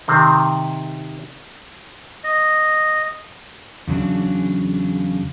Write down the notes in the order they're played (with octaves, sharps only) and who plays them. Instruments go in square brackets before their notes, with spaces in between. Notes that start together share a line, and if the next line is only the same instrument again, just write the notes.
[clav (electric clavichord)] C3 D#3 C4
[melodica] D#5
[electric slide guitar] E2 C#3 F#3 D4